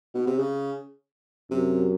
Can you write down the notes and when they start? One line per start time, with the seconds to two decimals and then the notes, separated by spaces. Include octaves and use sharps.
0.14 B2
0.27 C3
0.39 C#3
1.51 F#2 C3